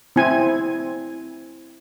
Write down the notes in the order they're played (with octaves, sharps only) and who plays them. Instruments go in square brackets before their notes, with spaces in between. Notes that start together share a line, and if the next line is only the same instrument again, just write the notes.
[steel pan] C4 E4 G#5